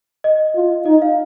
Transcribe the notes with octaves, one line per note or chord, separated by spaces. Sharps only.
D#5
F4
D#4 D#5
F5